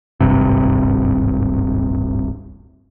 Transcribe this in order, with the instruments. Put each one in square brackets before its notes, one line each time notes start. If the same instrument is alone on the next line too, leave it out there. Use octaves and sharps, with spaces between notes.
[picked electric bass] D1 G#1 G2 C3